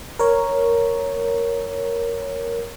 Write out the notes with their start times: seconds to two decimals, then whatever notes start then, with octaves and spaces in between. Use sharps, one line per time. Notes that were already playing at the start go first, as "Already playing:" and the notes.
0.19 A#4 C#5